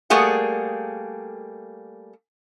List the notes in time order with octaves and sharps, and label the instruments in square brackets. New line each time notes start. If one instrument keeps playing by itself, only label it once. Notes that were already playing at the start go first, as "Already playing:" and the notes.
[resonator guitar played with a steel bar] G3 A3 A#3 G#4 F#5